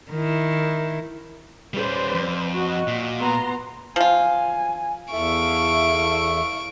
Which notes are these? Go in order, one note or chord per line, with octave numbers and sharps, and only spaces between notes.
D#3 E4
G3 C#4 B4 C5 D5
F2
F#4 D#5
A#2
B3 A#5 C6
F3 F4 G#5
E2 E4 A4 E5 F5 C#6 D7